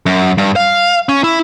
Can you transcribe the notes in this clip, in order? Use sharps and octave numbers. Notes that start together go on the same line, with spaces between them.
F#2
G2
F5
C#4
E4